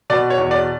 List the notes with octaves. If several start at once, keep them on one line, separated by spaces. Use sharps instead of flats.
B2 D5
C#5
E2
D5